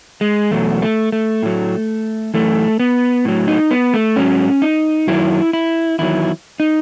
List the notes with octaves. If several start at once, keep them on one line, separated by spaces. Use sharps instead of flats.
G#3
E2 B2 F#3 A3
A3
A3
A2 F#3
F#2 E3 A3
B3
A2 F#3
D#4
B3
A3
G#2 F#3 C#4
D#4
F#2 D#3 F#3 E4
E4
E2 D#3 F#3 E4
D#4